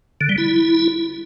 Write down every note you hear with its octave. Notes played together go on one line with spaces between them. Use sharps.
D3
G3
E4